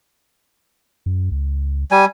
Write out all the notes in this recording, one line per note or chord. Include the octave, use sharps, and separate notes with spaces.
F#2
C#2
G3 G#5